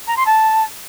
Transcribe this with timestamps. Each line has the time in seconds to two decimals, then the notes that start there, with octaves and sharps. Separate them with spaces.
0.07 A#5
0.16 C6
0.26 A5